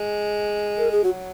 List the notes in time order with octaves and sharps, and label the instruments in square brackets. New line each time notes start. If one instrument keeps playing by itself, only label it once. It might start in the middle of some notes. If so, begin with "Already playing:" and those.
Already playing: [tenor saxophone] G#3
[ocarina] A#4
G#4
[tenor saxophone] F#3 [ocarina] F#4